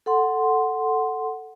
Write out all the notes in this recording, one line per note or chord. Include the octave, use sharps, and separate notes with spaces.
A4 F#5 C6